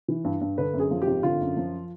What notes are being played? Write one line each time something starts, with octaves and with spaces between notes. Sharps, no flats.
E3
G2
G2
D3 B4
F#2
G#4
F3
G4
G#1
D3 F4
F#2
F3